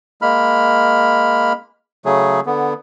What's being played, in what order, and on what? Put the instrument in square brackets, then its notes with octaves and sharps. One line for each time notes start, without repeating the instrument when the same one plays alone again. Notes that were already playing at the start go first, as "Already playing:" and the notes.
[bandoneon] G#3 A#3 B5 F6
C#3 F#3 A3 G#4
D3 B3